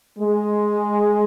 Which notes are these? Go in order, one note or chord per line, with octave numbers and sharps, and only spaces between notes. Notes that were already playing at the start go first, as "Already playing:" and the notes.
G#3